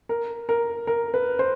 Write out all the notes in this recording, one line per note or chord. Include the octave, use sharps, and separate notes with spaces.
A#4
A#4
A#4
B4
C5